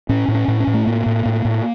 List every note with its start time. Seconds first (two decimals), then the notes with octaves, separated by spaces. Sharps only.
0.09 A2 C#4
0.28 A2
0.35 C#4
0.48 A2
0.60 C#4
0.67 A2
0.74 A3
0.86 A2 A#3
1.06 A2
1.26 A2
1.45 A2